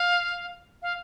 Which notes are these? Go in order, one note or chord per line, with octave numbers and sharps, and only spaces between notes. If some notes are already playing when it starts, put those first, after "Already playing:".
Already playing: F5
F5